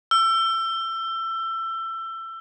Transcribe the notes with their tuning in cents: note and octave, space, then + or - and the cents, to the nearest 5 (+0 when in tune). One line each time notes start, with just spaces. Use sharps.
E6 +25